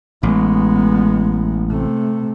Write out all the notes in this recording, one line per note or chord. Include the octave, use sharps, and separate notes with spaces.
A1 G#3 B3
C3 A3